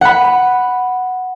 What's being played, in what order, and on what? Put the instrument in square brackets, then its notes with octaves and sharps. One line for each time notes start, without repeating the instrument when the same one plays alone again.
[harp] F#5 B5